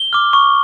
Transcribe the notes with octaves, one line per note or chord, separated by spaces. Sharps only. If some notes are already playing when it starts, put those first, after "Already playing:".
Already playing: G7
D6 F6
C#6